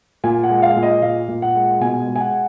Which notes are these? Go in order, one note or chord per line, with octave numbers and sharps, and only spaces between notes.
A#2 G#5
F#5
G#3
F5
A#2
D#5
A#2 F5
A#2
F#5
G#3
B2 G#5
G#3
G#5
F#5